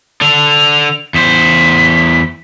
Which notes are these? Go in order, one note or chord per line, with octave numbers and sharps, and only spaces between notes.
D3 D4 F7
E2 C5 B6